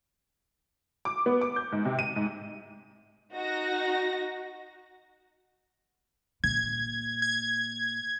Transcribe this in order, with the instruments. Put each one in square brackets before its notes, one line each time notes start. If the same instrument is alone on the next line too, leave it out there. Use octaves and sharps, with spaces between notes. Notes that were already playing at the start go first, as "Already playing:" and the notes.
[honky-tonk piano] D6
B3
D6
G6
G#2
C3
D#7
G#2
[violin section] D#4 F#4 A#6
[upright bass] A#2 [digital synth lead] G#6
[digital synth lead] G#6